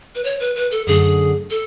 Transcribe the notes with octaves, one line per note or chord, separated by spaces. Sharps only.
B4
C#5
B4
B4
A4
F#2 D3 A3 G#4
A4